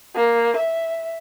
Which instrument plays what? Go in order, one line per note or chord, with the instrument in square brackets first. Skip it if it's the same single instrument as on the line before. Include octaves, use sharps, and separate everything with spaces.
[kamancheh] A#3
E5